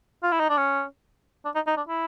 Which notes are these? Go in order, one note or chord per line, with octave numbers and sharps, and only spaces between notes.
F4
E4
D#4
D4
C#4
D4
D#4
D#4
D4
E4